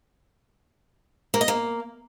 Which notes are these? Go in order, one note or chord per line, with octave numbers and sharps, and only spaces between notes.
A#3
D#5
A#3